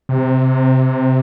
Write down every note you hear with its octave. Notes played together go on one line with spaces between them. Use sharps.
C3